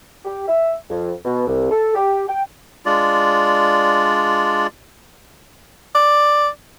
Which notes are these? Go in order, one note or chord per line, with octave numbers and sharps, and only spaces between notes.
G4
E5
F2
B2
C2
A4
G4
G5
G#3 D4 F4 D5
D5